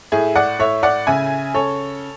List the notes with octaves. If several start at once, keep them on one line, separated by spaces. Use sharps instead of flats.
A2 E4 G#4
D5 F#5
A2 C#5 E5
D5 F#5
C#3 E5 G#5
C#3 A4 C#5